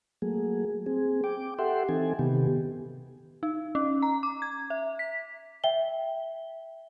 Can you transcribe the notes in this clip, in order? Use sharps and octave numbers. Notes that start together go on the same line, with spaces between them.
F#3 A3 A#3 G#4
C4 G#4
G5 D6
G4 A4 E5 F#5 G5 C6
E3 C4 D#4 A4 G#5
C3 D#3 B3 G4
D#4
C#4
A#5
D6
G#6
E5
B6
E5 G5 G7